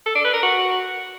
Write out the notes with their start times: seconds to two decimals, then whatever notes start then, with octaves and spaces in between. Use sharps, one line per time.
0.06 A4
0.15 D4
0.24 B4
0.34 A#4
0.43 F#4